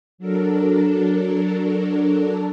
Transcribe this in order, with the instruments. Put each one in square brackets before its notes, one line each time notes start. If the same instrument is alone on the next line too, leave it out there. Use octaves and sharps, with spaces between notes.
[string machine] F#3 D4 A4 A#4